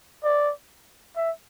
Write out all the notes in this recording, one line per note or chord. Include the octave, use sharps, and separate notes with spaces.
D5
E5